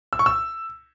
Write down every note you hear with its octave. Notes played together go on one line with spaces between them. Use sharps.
E6
C#6
E6